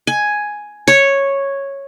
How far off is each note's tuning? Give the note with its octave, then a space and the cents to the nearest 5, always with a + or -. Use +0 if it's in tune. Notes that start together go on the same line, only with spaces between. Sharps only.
G#5 +5
C#5 -5